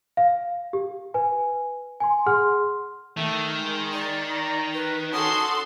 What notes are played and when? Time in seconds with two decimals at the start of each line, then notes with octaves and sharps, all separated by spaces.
0.17 F5
0.73 G4
1.14 B4 G#5
2.00 G#5 C6
2.26 G#4 F#5 C6 F6
3.17 D#3 A3
3.59 G#3
3.93 D5
4.31 A#5
4.74 B4
5.13 C#4 F#4 A4 C6 D#6